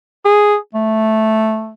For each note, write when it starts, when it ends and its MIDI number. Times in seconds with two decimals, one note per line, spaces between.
0.25 0.56 68
0.75 1.72 57